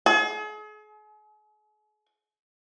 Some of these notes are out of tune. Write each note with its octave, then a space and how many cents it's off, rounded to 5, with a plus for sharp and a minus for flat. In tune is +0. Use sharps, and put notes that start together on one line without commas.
G#4 +40